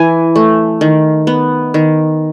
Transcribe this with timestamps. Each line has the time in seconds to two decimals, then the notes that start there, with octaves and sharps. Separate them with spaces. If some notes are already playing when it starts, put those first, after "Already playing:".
Already playing: E3 G#5
0.36 A3
0.81 D#3
1.27 B3
1.74 D#3